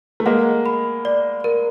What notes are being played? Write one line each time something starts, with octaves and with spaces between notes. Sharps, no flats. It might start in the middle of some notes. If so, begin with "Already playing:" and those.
A3
G#3 A#3 F#5
B5
D5
A#4